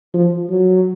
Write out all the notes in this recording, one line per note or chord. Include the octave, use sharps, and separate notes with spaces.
F3
F#3